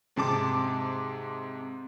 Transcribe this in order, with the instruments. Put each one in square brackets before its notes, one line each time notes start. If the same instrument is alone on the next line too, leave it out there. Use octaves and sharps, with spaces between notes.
[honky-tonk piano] G#2 C3 A5 D6